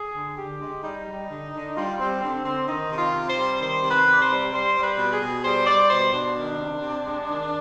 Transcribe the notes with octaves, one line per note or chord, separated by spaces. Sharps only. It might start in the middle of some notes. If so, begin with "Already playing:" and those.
Already playing: G#4
D3
D3 G4
G#3
G3 D#4
G3
D3
D3
G3 F4
G3 C4
D3 C4
D3 C4
D#3 D#4
C3
F4
C3
C5
G3
D#3 C5
C3
B4
C3 D5
C5
G3
G3 C5
G3
B4
B2
G#4
B2
G3 C5
G3 D5
B2 C5
B2 D4
D#3
C3
C3
G#3
D#3